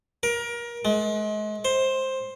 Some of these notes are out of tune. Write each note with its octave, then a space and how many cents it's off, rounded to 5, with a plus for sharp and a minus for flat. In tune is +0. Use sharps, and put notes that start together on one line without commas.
A#4 +25
G#3 +35
C5 +10